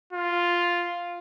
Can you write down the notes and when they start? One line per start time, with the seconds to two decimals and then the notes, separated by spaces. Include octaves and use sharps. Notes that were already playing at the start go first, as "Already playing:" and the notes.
0.13 F4